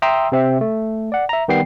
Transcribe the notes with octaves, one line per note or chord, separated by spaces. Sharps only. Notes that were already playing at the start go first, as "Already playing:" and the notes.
E5 G5 A#5 C6 D#6 E6
C3 C4 E5
A3
D5 F#5
E5 A#5
D#3 G3 B3 G5 C7